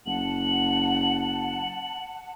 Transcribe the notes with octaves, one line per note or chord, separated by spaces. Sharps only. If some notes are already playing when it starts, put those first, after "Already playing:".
F#1 F#5 A5 F#7